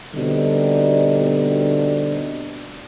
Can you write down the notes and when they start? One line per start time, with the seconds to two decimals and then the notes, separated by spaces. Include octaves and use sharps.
0.15 B2 D3 G3 C4 D4 D#4